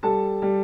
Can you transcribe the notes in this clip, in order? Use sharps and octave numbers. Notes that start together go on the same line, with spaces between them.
G3 A4 A5
G3